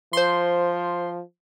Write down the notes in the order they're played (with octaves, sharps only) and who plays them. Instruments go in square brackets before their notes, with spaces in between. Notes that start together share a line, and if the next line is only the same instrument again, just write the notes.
[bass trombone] F3 [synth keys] C5 C6